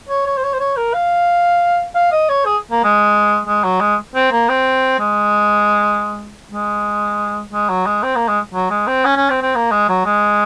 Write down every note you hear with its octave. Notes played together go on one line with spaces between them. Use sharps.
C#5
C#5
C5
C#5
C5
C#5
A#4
F5
F5
D#5
C#5
G#4
A#3
G#3
G#3
F#3
G#3
C4
A#3
C4
G#3
G#3
G#3
F#3
G#3
C4
A#3
G#3
F#3
G#3
C4
C#4
C#4
C4
C4
A#3
G#3
F#3
G#3